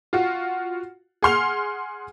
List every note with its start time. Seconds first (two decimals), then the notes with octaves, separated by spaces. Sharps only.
0.13 F4 F#4
1.22 G#4 F#5 C6 F6 F7